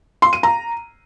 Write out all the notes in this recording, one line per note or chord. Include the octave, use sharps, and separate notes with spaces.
C6
D#7
A#5